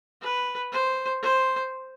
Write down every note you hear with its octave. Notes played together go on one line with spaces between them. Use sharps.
B4
C5
C5